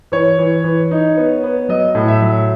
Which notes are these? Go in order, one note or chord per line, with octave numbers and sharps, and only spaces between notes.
E3 C#5
E3
E3
D#4
B3
B3
F#3 D#5
A2
E5
F#3